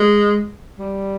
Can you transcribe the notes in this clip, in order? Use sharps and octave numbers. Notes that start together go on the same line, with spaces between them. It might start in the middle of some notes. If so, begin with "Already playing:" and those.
Already playing: G#3
G3